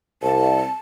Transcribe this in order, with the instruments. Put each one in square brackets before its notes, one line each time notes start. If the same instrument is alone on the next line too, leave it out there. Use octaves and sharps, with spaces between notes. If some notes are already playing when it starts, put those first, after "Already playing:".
[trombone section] C2 [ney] A5